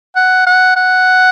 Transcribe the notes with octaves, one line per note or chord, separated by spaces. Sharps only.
F#5
F#5
F#5